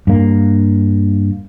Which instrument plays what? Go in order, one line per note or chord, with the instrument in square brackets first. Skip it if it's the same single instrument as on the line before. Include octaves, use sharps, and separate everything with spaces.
[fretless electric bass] G2 A#3